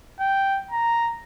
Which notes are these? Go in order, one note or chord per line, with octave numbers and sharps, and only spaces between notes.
G5
A#5